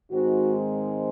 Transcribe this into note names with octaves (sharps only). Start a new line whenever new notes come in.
G#2 D#3 G#3 C4 D#4 F#4